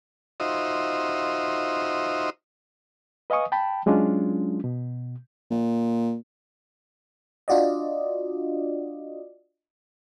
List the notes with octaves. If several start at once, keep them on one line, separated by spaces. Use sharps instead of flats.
D#4 F4 F#4 C5 D#5 E5
B4 D#5 F5 G#5 C#6 D#6
G5 A5 B5
F#3 G#3 C#4 D4 F4
B2
A#2
D4 F4 F#4 D5 D#5